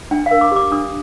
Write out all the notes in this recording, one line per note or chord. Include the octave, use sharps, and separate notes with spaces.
D4 G5
F5
A#4
D6
G4 D6
D4 D#6